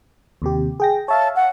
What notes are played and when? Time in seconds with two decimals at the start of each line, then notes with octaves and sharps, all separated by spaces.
0.42 D#2 C3 G4
0.80 G#4 G5 A#6
1.08 C#5 E5 F5 A5
1.36 F#5